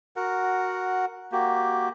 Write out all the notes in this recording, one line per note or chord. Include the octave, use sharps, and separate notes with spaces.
F#4 A#4 F#5
A#3 F#4 G4